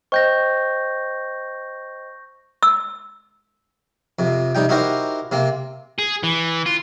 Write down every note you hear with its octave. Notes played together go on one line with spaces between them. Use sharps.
C5 D#5 G5 C#6 G6 A#6
E6
F2 C3
C3 G3 D#4 G5
D#4 E4 F#4 G4 A#4 C5
C3 A#3 C4
G#4
E3
F4